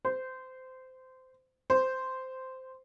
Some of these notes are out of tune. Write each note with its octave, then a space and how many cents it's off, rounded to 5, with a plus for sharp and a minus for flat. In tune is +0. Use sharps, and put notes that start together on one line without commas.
C5 -20
C5 -10